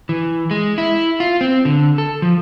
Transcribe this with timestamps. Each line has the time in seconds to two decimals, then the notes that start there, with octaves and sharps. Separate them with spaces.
0.09 E3
0.51 G#3
0.78 E4
1.20 F4
1.41 C4
1.65 D3
1.98 A4
2.22 F3